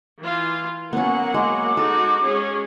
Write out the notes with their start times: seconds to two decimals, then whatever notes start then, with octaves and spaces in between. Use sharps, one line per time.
0.23 E3 F4
0.93 F#3 A#3 B3 C#4 F#5
1.34 G#3 D6
1.77 G#3 D#4 F#4 A4
2.24 G#3 C#4 G#4